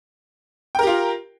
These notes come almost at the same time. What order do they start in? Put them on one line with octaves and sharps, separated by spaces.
G5 A#4 G4 F4